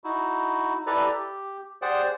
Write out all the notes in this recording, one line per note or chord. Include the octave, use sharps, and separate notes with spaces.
D#4 E4 F#4
E4 G4 A4 B4 D5 A#5
G4
G4 G#4 C5 D5 F#5 G5